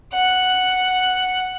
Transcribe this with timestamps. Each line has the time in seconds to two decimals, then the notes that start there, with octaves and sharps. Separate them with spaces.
0.14 F#5